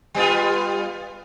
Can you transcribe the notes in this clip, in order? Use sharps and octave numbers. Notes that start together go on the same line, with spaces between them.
G3 B3 F4